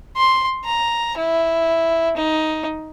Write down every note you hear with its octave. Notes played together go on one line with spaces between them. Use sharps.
C6
A#5
E4
D#4